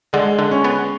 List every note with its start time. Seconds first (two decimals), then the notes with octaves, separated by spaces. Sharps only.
0.13 D3 G#3
0.39 D3
0.51 C#4
0.64 B3